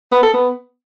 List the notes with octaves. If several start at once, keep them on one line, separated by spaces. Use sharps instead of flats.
B3
A4
B3